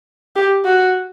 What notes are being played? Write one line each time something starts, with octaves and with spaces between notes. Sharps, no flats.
G4
F#4